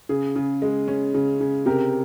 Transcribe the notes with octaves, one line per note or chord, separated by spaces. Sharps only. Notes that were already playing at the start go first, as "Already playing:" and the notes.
C#3 G#4
C#3
G#3
C#4
C#3
C#3
C3 G4 A#4